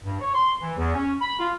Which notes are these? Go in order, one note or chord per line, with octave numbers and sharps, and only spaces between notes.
G2
C#5
C6
E3
E2
C#4
B5
F4